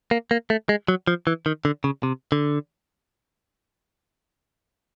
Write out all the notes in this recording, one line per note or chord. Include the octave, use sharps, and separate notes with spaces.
A#3
A#3
A3
G#3
F#3
F3
E3
D#3
D3
C#3
C3
D3